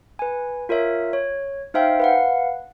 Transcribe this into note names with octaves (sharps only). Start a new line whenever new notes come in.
B4 G#5
F4 A#4 C#5 E5
C#5
D#4 C5 E5 F5 G5
B4 F5 F#5